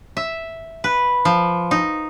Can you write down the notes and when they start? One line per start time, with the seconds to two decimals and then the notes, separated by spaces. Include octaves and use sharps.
0.17 E5
0.84 B4
1.25 F3
1.71 D#4